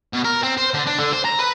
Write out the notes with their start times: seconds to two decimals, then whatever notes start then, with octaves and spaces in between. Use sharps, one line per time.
0.13 B2
0.24 A#4
0.43 C4
0.58 C5
0.74 D3
0.87 D4
0.99 D3
1.13 C5
1.25 A#5
1.39 B4